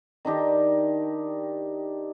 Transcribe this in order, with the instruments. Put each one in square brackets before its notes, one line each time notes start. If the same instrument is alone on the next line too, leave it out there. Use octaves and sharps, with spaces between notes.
[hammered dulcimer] D#3 D4 D#4 G4